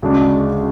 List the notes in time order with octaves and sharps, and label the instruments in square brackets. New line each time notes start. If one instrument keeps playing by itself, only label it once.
[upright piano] D2 C#3 G#3 D4